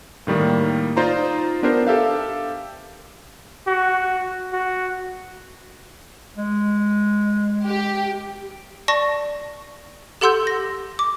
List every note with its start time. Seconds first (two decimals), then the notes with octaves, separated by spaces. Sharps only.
0.27 A2 D#3 G3 A#3
0.97 D#4 F4 C5 D5 A#5
1.63 B3 D4 G4 A#4 C5
1.87 G4 A4 E5 F5
3.67 F#4
4.53 F#4
6.37 G#3
7.66 G4
8.88 D5 A5 C#6 A#6
10.21 G4 A4 F#5 C6 E6 G6
10.47 A#6
10.99 D6